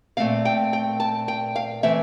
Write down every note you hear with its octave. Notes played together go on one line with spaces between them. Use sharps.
A#2 A3 C4 F5
G5
G5
A5
G5
F5
E3 A3 C4 E5